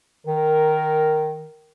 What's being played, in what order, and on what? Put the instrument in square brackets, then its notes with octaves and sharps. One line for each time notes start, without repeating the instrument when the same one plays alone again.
[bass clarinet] D#3 [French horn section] A#4